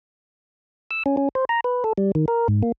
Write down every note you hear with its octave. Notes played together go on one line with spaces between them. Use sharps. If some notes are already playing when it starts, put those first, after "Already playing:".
E6
C#4
C#4
C5
A#5
B4
A4
G3
D#3
A#4
G#2
A#3